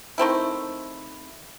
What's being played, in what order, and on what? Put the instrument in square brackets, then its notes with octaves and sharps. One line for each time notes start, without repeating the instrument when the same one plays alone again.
[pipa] D#3 A3 C4 E4